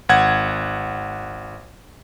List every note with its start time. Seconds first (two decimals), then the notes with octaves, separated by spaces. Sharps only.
0.09 G#1 F#5 G#6